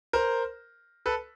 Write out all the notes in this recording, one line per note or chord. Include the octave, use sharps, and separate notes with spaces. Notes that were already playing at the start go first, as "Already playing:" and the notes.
A#4 C5
A4 B4